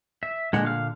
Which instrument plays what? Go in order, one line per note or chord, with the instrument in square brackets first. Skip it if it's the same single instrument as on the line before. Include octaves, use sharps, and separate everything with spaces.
[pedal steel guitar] E5
[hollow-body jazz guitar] A#2 D3 F#5 [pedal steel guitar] G#3
[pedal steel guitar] F5 F6